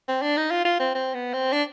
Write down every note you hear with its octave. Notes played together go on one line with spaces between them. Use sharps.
C4
D4
D#4
F4
F4
C4
C4
B3
C4
D4